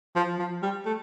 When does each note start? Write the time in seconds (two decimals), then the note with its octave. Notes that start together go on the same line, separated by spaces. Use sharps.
0.16 F3
0.39 F3
0.63 G3
0.86 A3